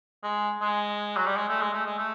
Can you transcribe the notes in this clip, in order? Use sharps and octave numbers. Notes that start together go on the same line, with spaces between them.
G#3
G#3
F#3
G3
G#3
A3
G#3
A3
G#3
A3